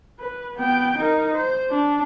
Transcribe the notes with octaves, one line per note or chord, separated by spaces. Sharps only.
B4
B3 G5
D#4 A#4
C5
D4